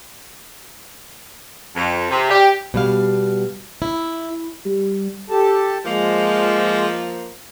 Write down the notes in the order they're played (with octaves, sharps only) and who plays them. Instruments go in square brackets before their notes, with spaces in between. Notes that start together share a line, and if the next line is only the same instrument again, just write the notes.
[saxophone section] F2
C3
G4
[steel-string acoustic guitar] B2 G3 F5
E4
[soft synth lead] G3
[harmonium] G4 A4 A5
[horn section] F3 A#3 [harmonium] G#3